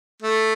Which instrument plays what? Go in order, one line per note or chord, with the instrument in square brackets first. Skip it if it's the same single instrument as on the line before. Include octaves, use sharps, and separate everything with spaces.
[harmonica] A3